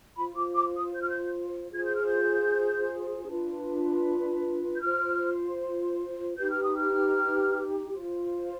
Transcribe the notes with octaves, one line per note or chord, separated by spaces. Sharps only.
F4 C5 B5
D6
D6
D#6
G6
F6
G6
F4 G#4 C5 G#6
G6
F6
G6
D4 F4 B4
G6
F4 C5 F6
D#4 G4 B4 G6
F6
D#6
F6
F4 C5